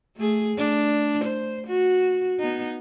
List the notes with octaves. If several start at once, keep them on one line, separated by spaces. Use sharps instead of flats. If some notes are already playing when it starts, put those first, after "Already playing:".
A3 G#4
A3 D4
C5
F#4
B3 D#4